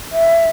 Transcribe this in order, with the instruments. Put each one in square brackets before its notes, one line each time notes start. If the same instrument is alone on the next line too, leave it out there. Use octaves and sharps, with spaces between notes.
[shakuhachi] E5